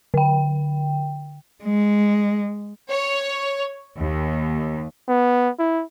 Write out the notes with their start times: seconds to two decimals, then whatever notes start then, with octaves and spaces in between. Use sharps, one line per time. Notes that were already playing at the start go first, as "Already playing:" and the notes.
0.14 D3 G5
1.64 G#3
2.89 C#5
3.98 D#2
5.08 B3
5.59 E4